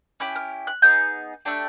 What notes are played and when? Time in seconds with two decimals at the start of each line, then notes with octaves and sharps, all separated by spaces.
0.20 C#4 E4 G4 F#6
0.35 F6
0.67 F#6
0.82 B3 D#4 G#4 G6
1.45 A3 D4 G4